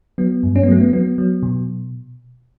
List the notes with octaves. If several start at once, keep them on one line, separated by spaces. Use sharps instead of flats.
F#3 B3
G2
C#4
B3
F#3 A3
B3
F#3 B3
F#3
B2